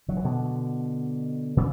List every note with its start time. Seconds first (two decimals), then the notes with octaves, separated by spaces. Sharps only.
0.08 D3 F#3
0.17 E3
0.24 B2 D3
1.57 A#2 C#3